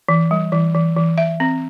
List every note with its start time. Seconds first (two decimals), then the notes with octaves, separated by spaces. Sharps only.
0.09 E3
0.31 G3
0.52 E3
0.75 E3
0.96 E3
1.18 E5
1.40 C4